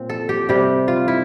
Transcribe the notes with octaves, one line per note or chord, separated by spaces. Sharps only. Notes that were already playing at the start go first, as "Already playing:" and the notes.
Already playing: A#2 C4
A4
G4
C3 G3 G4
F4
E4